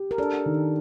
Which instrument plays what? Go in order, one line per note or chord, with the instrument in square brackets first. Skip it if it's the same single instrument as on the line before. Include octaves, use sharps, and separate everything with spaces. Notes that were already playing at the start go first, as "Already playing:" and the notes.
Already playing: [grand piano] G4
[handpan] A#4
[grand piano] D4 [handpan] A4
[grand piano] D#3